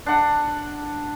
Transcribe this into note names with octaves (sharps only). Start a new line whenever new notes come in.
D4 F#5